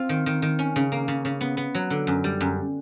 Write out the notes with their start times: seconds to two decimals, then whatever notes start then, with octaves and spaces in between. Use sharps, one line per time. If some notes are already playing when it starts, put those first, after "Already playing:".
Already playing: C4 F4
0.09 D#3
0.26 D#3
0.42 D#3
0.59 C#4
0.76 C#3
0.92 A#3
1.08 C#3
1.25 C#3
1.41 B3
1.57 B3
1.75 F#3
1.90 D3
2.07 F#2
2.24 G3
2.41 F#2